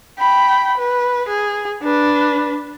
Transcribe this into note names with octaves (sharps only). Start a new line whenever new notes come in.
G5 B5
B4
G#4
D4 B4